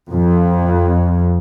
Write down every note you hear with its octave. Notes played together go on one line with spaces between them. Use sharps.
F2